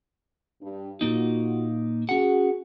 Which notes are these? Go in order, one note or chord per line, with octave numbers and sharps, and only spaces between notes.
G2
A#2 A#3 D#4 F4 F#4
C#4 F#4 G#4 F#5